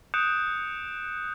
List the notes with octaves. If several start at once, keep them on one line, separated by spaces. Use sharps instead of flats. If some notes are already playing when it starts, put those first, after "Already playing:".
D#6 F#6 G6 C#7 D7 E7